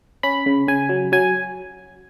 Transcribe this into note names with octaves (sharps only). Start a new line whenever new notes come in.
C#4 B5
C#3
C#3 G#5
F#3
F#3 G#5